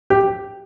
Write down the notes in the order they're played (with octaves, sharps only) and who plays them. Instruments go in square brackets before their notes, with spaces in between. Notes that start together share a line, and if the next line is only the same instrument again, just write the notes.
[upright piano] G4